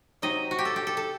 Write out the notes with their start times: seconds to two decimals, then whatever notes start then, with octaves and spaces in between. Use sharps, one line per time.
0.22 C3 F#3 C4 D#4 D#5
0.51 F#4
0.58 G4
0.65 A4
0.76 G4
0.87 A4
0.97 A4